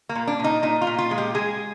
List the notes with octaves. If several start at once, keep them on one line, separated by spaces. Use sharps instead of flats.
A#3
A#2
D4
A#2 D#4
A#2 D#4
F4
A#2
F4
G#3
G4
G#3 G#4